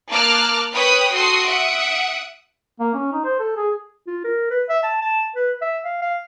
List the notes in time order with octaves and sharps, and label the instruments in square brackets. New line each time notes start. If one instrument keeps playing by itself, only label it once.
[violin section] A#3 A5 D6 F6 F#6
B4 C#5 G5 B5 D#6 F#6
F#4 A4 C6 D#6 C7
E5 F#5 D#6 D7
[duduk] A#3
C#4
D#4
C5
A4
G#4
[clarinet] F4
A#4
B4
E5
A5
A5
B4
E5
F5
F5